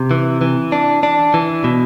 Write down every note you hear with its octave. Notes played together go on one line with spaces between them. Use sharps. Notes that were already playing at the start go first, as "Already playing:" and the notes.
Already playing: C3
E3
E3
D4
D4
E3
B2